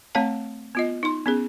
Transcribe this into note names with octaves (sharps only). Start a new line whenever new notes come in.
A3 C4 C#5 F5 A5
B3 F4 D#5
D#4 C6
B3 C#4 G#4